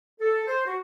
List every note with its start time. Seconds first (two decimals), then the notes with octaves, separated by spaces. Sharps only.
0.20 A4
0.47 C5
0.66 F#4